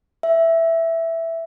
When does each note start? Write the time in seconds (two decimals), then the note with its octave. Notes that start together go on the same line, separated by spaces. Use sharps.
0.23 E5